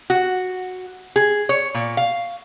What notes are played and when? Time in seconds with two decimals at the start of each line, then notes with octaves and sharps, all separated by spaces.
0.10 F#4
1.16 G#4
1.49 C#5
1.74 A#2
1.97 F5